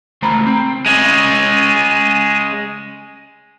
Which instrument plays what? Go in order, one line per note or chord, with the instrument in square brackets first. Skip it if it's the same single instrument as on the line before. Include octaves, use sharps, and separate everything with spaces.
[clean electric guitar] C#2 A3 C5 A#5 B5
C4
[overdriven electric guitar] G#3 C#4